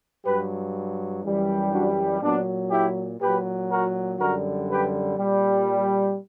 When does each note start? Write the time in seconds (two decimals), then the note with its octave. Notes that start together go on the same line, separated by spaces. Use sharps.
0.25 G2 F#3 G4 B4
1.23 F#2 E3 G3
1.72 D4 F#4
2.21 A#2 F#3 B3 D4
2.71 E4 G4
3.20 A#2 F#3 G4 B4
3.69 F#4 A#4
4.19 F#2 D3 G3 F#4 A#4
4.69 G4 B4
5.18 A#2 G3